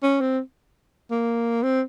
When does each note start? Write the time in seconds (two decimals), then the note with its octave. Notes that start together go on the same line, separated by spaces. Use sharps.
0.03 C#4
0.21 C4
1.11 A#3
1.63 C4